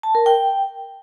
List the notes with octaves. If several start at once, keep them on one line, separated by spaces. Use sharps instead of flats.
A5
A#4
G5